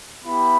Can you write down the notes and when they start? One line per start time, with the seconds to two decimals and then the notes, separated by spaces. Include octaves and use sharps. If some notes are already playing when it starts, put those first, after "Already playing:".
0.23 B3 E4 G4 B5